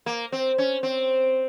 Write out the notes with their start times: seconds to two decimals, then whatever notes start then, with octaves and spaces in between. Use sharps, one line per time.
0.06 A#3
0.32 C4
0.58 C#4
0.83 C4